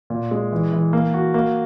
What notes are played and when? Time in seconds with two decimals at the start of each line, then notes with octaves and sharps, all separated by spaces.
0.10 A#2
0.31 G#3
0.52 E3
0.73 E3
0.93 A#3
1.14 F#4
1.34 A#3